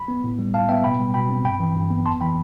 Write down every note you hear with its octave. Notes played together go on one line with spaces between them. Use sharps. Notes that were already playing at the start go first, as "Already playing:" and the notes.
Already playing: B5
B3
A2
G3
A2 F5 A5
B3 E5 G5
B2 G5 B5
G3
B2 G5 B5
C4
G2 G5 B5
E3
G2
B3
F2 A5 C6
E3 G5 B5